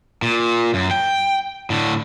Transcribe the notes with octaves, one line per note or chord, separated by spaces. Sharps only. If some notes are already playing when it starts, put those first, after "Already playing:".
A#2
F#2
G5
A2 D3